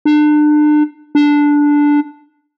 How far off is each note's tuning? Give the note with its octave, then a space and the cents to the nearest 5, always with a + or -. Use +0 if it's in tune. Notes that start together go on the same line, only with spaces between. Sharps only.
D4 +35
D4 -5